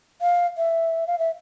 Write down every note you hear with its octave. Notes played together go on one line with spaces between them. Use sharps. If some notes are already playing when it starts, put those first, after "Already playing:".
F5
E5
F5
E5